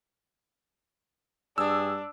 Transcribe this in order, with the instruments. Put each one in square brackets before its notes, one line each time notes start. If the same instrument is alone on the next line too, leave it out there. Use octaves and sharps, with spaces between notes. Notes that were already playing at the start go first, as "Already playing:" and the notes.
[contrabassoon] G2 [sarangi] D4 [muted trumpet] G#4 [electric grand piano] E6